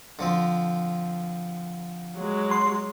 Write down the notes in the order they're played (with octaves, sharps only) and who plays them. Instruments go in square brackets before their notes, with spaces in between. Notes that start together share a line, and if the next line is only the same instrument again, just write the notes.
[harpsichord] D3 F3 C4
[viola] F#3 G#3
[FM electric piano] C6